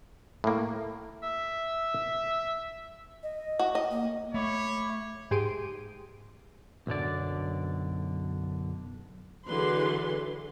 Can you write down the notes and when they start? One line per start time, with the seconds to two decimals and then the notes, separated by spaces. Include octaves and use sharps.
0.44 A2 A#3
1.23 E5
3.23 D#5
3.59 F#4
3.75 D#5
3.91 A#3
4.34 A3 C#5 E5 B5 D6
5.31 G#2 G4 G#4 C6 D7 D#7
6.87 B1 F#2 D3 D5
9.48 D3 E3 F#3 G#4 B4 C6